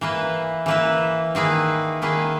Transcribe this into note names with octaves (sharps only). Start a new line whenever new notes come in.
E3 A#3 E4 B4
E3 A#3 E4 B4
D#3 A#3 E4 G#4 B4
D#3 A#3 E4 G#4 B4